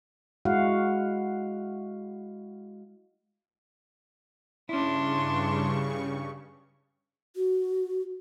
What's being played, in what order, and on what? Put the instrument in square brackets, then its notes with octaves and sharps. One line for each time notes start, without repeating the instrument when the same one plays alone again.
[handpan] G#3 E4 F#4 F5 F#5
[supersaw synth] G2 C#3 C#6 [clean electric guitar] C#4 E4 [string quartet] D4 C6
[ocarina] F#4